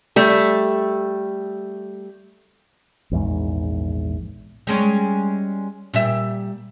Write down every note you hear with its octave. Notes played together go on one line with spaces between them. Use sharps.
G3 A3
A#1 E2 G#2
G3 G#3 C#4
A#2 G3 E5